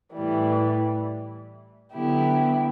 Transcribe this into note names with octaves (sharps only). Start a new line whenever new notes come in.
A2 E3 G3
D3 F#3 B3 E4 G4